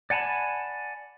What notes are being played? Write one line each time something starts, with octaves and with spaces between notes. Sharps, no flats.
D5 F#5 G#5 A5 B5